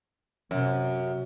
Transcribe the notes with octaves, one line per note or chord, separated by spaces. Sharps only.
F#2 C3